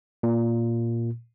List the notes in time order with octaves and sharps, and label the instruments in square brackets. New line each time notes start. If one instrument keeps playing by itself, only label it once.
[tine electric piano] A#2